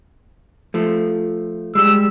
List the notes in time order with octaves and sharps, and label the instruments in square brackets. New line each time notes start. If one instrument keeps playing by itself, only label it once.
[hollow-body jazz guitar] F3 A3
[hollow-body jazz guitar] G3 G#3 [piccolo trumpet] E6